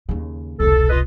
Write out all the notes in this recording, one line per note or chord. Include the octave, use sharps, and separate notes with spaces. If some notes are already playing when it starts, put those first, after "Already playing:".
D#2 C#3
E1 C2 A4
F4 B4 D#5